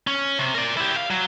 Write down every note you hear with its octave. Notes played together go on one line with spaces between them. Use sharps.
C#4
C3
A#4 D5
E4 G4
F5
F#3